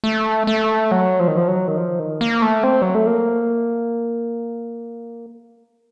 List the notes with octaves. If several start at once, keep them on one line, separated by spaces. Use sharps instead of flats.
A3
A3
F#3
F3
D#3
F3
F#3
D#3
F3
D#3
A#3
A3
C4
F#3
A3
A#3